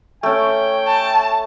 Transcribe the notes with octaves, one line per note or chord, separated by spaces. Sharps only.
A3 C#4 G5
A5